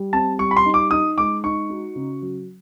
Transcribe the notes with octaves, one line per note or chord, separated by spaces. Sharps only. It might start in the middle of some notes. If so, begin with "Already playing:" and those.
Already playing: G3
C4 A5
G3 C#6
B5
C6
D#4
D6
D#4 D#6
G#3 D6
D#4 C#6
F#4
C#3
F#3